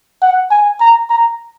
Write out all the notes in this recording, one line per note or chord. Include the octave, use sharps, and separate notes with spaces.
F#5
G#5
A#5
A#5